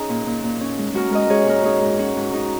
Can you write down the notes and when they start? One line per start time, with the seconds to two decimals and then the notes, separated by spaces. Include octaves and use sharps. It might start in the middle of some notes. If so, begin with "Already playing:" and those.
Already playing: C#4 D#4 G#4
0.09 A#2
0.26 A#2
0.44 A#2
0.61 C#4
0.78 G#3
0.93 G#3 F#4 A#4
1.10 G#3 A#4 D#5
1.29 G#3 G#4 C#5
1.45 A#2 F#4 A#4
1.63 C#4 D#4 G#4
1.81 G#2
1.99 C#4 F#4
2.16 G#2
2.33 G#2 D#4